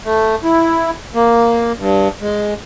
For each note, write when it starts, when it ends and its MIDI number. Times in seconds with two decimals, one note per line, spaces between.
0.05 0.35 57
0.44 0.91 64
1.14 1.72 58
1.77 2.08 43
2.21 2.54 56